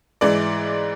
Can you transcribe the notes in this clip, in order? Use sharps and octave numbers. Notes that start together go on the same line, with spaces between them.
G#2 E3 D5